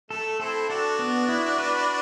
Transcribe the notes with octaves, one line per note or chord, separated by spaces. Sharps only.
A3 A4
C4 E4 A4
D4 F#4 A4
B3
E4
B4